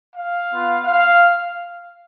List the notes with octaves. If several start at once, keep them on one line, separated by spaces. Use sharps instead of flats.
F5
B3 F4
F5